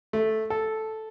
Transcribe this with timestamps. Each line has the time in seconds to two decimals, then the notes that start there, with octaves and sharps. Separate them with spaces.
0.13 A3
0.50 A4